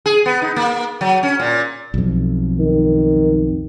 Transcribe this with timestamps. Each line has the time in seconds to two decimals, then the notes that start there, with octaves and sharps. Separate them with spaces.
0.06 G#4
0.26 B3
0.42 D#4
0.56 A#3
1.01 F#3
1.23 C#4
1.40 A#2
1.94 B1 F2
2.59 D#3